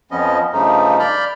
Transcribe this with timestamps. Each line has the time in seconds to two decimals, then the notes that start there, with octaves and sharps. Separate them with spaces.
0.11 F2 F3 B3 C#4 D#5
0.53 G2 C#3 F3 A3 D#4
1.00 D5 B5 F6 G6